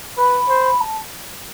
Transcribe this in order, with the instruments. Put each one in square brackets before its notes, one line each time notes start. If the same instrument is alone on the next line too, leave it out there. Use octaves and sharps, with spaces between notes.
[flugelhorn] B4 [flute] B5
[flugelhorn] C5
[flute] A5